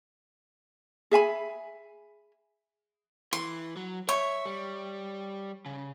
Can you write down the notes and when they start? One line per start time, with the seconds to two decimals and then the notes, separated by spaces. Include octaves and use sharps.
1.11 G#4 E5 G#5 B5
3.33 E3 C6
3.76 F#3
4.09 C#5 E5
4.46 G3
5.66 C#3